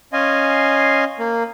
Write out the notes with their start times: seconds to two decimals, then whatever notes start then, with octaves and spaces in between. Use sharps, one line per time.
0.13 C#4 D#5 F5 G#5 C6
1.19 A#3